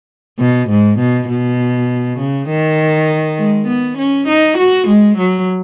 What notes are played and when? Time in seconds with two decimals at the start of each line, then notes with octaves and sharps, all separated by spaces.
0.40 B2
0.70 G#2
0.99 B2
1.29 B2
2.19 C#3
2.49 D#3
3.38 G#3
3.68 B3
3.98 C#4
4.28 D#4
4.58 F#4
4.88 G#3
5.18 F#3